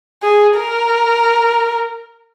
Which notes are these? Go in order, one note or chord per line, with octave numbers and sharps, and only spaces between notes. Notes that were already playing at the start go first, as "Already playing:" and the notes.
G#4
A#4